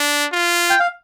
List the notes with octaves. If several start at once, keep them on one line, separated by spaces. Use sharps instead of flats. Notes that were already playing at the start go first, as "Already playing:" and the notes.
Already playing: D4
F4
G5
F5